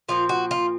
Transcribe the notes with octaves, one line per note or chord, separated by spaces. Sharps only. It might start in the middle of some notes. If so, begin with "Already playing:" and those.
A#2 F3 C4 F4
F#4
F4